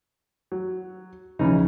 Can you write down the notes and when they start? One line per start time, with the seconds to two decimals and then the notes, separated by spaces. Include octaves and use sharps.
0.52 F#3
1.39 C2 C#3 E3 F3 C#4 D#4